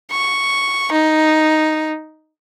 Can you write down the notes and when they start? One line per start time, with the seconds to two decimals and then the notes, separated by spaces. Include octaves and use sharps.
0.11 C#6
0.92 D#4